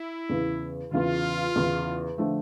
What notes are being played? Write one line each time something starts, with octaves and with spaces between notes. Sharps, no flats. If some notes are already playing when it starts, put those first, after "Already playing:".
Already playing: E4
E2 C#3 E3
E2 C#3 E3 F4
E2 C#3 E3
D3 F3 A3